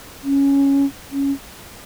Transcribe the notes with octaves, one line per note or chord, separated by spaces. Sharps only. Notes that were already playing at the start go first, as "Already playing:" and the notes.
C#4
C#4